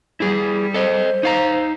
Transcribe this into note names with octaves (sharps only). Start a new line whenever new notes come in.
G3 E4 G#4
A4 C5 D#5
D#4 F5 A#5